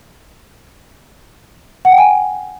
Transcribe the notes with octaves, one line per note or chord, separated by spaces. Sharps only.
F#5
G5
G#5